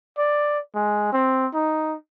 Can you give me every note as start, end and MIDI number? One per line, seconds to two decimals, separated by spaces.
0.18 0.59 74
0.75 1.12 56
1.13 1.47 60
1.55 1.95 63